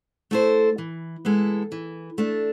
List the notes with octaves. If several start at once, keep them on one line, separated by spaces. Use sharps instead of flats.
A3 E4 A4 C5
E3
G#3 B3 E4 A4
E3
A3 D4